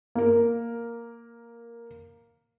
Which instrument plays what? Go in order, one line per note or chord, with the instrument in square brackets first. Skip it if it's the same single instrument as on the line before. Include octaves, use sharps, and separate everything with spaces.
[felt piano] A#3 A#4